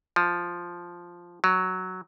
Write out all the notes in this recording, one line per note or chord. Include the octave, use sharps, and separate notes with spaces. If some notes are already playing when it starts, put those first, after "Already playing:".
F3
F#3